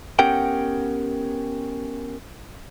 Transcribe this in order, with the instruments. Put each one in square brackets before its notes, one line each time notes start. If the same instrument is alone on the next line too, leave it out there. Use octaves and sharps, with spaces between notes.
[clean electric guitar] B3 C#4 G4 A#4 F#5 G5